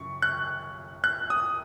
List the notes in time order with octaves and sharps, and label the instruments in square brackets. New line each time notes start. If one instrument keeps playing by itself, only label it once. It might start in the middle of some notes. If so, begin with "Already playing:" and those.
Already playing: [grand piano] F#2 C#3 C#6
F#6
F#6
D#6